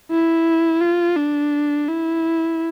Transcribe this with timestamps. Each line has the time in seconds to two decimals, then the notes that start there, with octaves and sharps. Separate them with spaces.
0.10 E4
0.81 F4
1.16 D4
1.88 E4